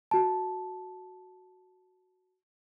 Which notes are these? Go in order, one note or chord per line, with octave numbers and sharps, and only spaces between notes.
F#4 A5